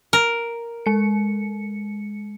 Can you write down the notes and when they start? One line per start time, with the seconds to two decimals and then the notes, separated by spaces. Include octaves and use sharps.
0.13 A#4
0.86 G#3 C#7